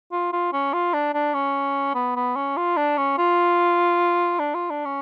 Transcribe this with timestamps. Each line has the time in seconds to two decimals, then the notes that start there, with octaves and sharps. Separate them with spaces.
0.12 F4
0.33 F4
0.53 C#4
0.73 F4
0.93 D4
1.14 D4
1.34 C#4
1.95 B3
2.16 B3
2.36 C#4
2.57 F4
2.77 D4
2.98 C#4
3.18 F4
4.39 D4
4.54 F4
4.70 D4
4.85 C#4